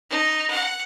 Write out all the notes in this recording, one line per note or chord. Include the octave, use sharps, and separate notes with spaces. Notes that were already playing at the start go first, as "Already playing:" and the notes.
D#4
F#5